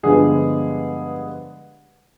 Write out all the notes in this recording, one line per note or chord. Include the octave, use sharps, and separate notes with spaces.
G2 D3 F3 G#3 B3 G#4